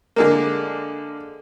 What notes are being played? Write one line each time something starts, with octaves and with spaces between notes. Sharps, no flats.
D3 G#3 A#3